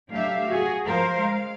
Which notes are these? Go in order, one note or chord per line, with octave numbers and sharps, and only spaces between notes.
F#3 A3 D4 G4 E5 F5
F#4 G#4
F3 A#4 C5 F5
G#3 F5